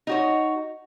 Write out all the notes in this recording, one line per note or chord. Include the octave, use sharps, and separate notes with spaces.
D#4 F#4 C#5